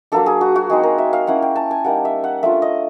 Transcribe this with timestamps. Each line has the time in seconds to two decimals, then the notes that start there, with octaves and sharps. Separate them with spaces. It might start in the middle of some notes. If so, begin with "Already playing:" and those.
0.12 F#3 A#3 D4 A4
0.26 G#4
0.41 F#4
0.56 F#4
0.70 G#3 C4 D#4 G#4
0.83 A#4
0.98 E5
1.13 F5
1.27 A#3 C#4 E4 F#5
1.42 G5
1.56 A5
1.71 G#5
1.84 G3 A#3 D#4 F#5
2.05 E5
2.24 F#5
2.43 A3 D4 F4 E5
2.62 D#5